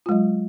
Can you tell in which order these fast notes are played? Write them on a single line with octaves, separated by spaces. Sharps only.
F4 G#3 F#3